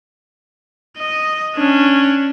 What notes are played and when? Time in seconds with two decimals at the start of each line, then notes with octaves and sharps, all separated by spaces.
0.98 D#5
1.56 C#4 D4